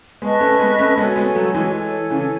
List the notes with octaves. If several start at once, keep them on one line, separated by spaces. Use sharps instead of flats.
G#3 B3 B4 D#5 A5 C#6
A3 C#4
G#3 B3
A3 C#4
G#3 B3 F#4 A4 C#5 G#5
G#3 B3
F#3 A3
E3 G#3
A4 C#5 G#5
C#3 E3